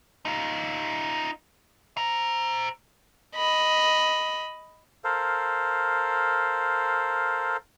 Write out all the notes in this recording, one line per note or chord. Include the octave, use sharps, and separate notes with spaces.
D#4 F4
C5 A#5
D#5 B5
A4 A#4 C5 F5